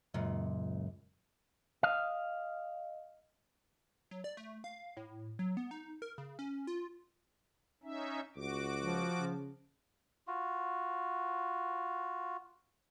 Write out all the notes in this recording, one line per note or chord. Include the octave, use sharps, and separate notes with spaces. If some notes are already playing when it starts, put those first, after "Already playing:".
C#2 F#2 A#2
D#5 F5
F#3
D5
A3
F5
A2
F#3
B3
D#4
A#4
C#3
C#4
F4
C#4 D#4 E5
C#2 F#4 D6
F3
C#3
F4 F#4